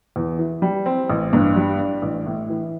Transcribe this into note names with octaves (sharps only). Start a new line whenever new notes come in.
E2
E3
G3
C4
A1
G2
G3
D4
A1
A2
E3